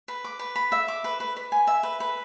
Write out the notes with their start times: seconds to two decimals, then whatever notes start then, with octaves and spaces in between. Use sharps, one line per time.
0.08 B4
0.24 D6
0.39 B4
0.56 B5
0.72 E5
0.88 D6
1.04 B4
1.20 B4
1.37 B4
1.52 G#5
1.67 E5
1.83 B4
2.00 B4